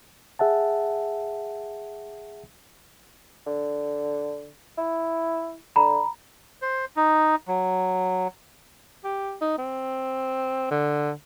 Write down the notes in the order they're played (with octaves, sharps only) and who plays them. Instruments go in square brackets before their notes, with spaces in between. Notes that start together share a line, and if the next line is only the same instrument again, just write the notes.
[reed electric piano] G#4 E5 F#5 A5
[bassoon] D3
E4
[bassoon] D3 [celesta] A#5 B5
[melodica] C5
D#4
F#3
[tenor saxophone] G4
D#4
C4
D3